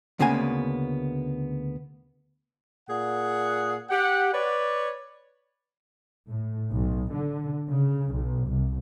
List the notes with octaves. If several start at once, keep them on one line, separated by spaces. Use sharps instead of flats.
D2 C#3 A#3 B3 G#5
A#2 G#4 F#5
G4 F#5
B4 C#5 D5
A2
B1
D3
C#3
B1
C2